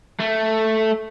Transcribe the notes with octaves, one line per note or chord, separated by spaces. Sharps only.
A3